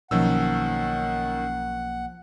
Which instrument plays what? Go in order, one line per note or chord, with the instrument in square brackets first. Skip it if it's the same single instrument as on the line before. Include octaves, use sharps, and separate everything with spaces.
[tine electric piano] B1 A#3 [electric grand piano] D#3 C#4 E6 [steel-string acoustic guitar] F3 [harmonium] F#5